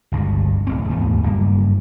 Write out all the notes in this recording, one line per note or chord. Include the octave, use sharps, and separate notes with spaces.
G1 C#2 G2
D1 A1 C4
D#2 G#2 A3 B3
F#1 G2 A#3